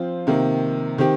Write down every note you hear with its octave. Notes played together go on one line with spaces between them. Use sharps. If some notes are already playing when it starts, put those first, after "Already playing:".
Already playing: F3 C4 F4
C3 D#3 A#3
D#3 C4 G4